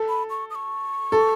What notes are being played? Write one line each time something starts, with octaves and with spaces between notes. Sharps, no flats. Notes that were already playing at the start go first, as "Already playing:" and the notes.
Already playing: A4
B5
C#6
D#6
C#6
A4